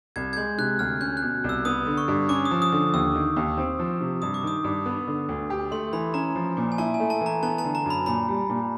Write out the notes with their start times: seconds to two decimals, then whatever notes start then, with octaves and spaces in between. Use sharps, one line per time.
0.16 C2 G#6
0.33 G#6
0.37 G#3 G6
0.58 C3 F#6
0.79 D2 F6
1.01 C#4 G6
1.17 F#6
1.22 B2
1.44 C2
1.49 E6
1.65 B3 D#6
1.86 D3
1.98 C#6
2.08 G2
2.29 C#4 D6
2.45 D#6
2.51 F3
2.62 D#6
2.72 D3
2.94 D#2 E6
3.15 D#3
3.36 D#2
3.58 C4
3.79 F3
4.01 C3
4.22 G2 D#6
4.34 D6
4.43 D#3 D#6
4.64 G2
4.86 B3
5.07 D3
5.29 D2
5.50 G4
5.71 A3 C6
5.93 E3 B5
6.14 C#4 A#5
6.35 F3
6.57 A#2
6.72 G#5
6.78 E4 A5
6.94 G#5
7.00 A3
7.10 A5
7.21 E3
7.26 A#5
7.43 B3 A5
7.58 A5
7.64 D3
7.75 A#5
7.86 F#2 B5
8.06 A#2 B5
8.28 G3
8.50 A#2